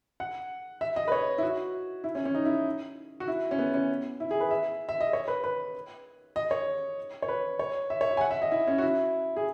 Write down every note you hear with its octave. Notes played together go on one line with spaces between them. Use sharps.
F#5
E5
D#5
B4
C#5
E4
F#4
E4
C#4
C#4
D#4
E4
F#4
E4
C#4
B3
C#4
E4
G#4
B4
E5
E5
D#5
C#5
B4
B4
D#5
C#5
C#5
B4
C#5
E5
C#5
E5
G#5
F#5
E5
D#5
E4
C#4
F#4
E4
G#4